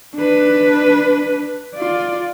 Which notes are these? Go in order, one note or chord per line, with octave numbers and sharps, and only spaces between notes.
D4 B4
F4 D5